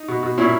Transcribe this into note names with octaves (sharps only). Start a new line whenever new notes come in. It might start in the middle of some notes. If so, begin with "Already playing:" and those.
Already playing: D#4
B2
B2
A#2 C#4 E4